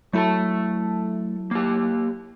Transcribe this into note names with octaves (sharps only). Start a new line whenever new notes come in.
F#3 A3 E4 A4 A5
A#3 G4